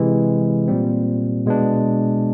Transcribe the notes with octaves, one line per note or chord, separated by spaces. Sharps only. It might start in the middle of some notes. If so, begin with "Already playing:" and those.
Already playing: C3 E3 G#3
A#2 G3 C4
B2 G#3 B3 D4